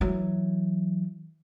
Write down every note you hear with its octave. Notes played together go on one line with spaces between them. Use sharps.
E3 F#3